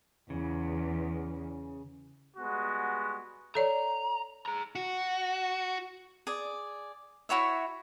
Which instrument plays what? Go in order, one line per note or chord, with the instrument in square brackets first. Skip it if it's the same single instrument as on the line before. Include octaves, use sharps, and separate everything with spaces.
[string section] E2 [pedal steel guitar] C#3
[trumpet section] G3 G#3 B3 F#4
[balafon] A4 C#5 D5 [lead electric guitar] A#5
[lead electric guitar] G#4 A#5
F#4
[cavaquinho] G#4 D5
E4 F#4 C#5 E5